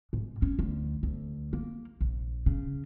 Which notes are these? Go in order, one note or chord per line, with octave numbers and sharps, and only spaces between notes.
G#2
C#4
D2
D2
A#3
A#1
C#3